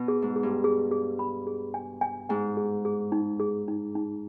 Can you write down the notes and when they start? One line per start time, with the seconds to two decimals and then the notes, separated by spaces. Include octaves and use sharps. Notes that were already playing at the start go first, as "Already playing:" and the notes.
Already playing: B2
0.08 G#4
0.22 G#2
0.36 G#4
0.43 G2
0.64 G#4
0.91 G#4
1.19 B5
1.47 G#4
1.74 G#5
2.01 G#5
2.29 G#2 G#5
2.57 G#4
2.85 G#4
3.12 D#4
3.40 G#4
3.68 D#4
3.95 D#4